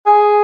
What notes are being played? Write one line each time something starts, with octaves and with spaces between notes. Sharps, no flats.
G#4